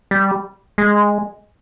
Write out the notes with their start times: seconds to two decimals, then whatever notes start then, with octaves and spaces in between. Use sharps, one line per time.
0.11 G3
0.78 G#3